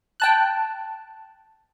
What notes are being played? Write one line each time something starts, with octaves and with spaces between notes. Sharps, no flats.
G5 A5 F#6